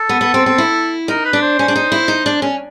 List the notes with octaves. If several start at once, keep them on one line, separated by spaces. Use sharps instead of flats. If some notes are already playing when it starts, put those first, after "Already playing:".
Already playing: A4
B3
B3
C4
C4
E4
D#4 A#4
B4
D4
C5
C#4
D4
D#4
E4
D#4
D4
C#4